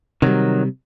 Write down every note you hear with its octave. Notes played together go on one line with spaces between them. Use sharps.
C3 D#3 F#3 G3